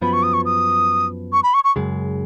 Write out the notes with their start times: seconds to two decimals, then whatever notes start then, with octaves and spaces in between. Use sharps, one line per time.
0.01 F#2 F3 B3 B5
0.13 C#6
0.23 D#6
0.34 C#6
0.45 D#6
1.33 C#6
1.43 B5
1.54 C#6
1.64 C#6
1.76 F#2 C#3 G#3